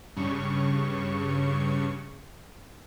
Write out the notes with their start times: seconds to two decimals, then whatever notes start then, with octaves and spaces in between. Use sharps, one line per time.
0.17 G2 C#3 C#6